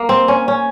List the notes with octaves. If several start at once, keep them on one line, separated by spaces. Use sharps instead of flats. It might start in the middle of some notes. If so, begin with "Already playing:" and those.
Already playing: A#3
C4
C#4
C#4